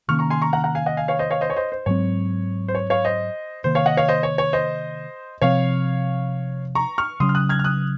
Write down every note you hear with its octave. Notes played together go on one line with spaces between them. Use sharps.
C3 D#3 A#3 C#4 C#6 F6
A#5 C#6
G#5 C6
A#5 C#6
F#5 A#5
F#5 A#5
F5 G#5
D#5 F#5
F5 G#5
C#5 F5
C5 D#5
C#5 F5
C5 D#5
C#5
C5 D#5
C5
G#2 F#3 C4 C#5
C5
C#5
C#5 F5
C5 D#5
C3 D#3 A#3 C5
C#5 F5
D#5 F#5
C#5 F5
C5 D#5
C#5
C#5
C5 D#5
C3 F3 C4 C#5 F5
A#5 C#6
C#6 F6
C#3 F#3 C#4 C6 D#6
F6
D#6 F#6
F6 G#6
F6
D#6 F#6